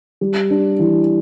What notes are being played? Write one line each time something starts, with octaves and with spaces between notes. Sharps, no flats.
G3
D4
E3